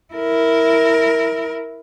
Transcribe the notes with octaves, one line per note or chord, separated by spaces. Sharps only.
E4 A#4